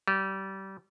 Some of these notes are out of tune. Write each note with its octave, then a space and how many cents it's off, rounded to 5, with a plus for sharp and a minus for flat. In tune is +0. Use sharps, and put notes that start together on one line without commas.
G3 -25